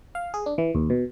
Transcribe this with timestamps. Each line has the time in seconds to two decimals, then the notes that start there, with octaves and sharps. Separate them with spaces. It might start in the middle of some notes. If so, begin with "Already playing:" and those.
0.15 F5
0.34 G#4
0.46 D4
0.58 E3
0.75 D#2
0.90 B2